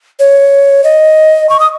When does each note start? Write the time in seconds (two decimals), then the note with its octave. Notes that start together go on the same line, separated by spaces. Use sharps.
0.19 C#5
0.84 D#5
1.49 C#6
1.60 D#6